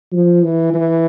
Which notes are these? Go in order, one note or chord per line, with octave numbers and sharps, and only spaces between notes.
F3
E3
E3